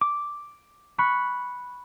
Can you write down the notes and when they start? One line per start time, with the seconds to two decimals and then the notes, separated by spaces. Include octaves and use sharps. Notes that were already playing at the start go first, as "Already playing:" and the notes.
0.01 D6
0.98 B5 C#6 F#6